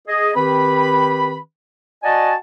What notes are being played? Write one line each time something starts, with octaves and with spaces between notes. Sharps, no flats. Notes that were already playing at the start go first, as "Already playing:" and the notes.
G#4 D#5
D#3 C4 G4 B4 B5
F#4 D5 D#5 F#5 G#5 A5